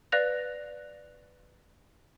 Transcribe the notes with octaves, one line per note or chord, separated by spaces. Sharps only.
B4 D5 F5 F#6 A#6 F7